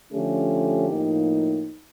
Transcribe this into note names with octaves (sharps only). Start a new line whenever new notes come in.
D3 F3 A3 C#4 G4
A2 F3 A#3 D#4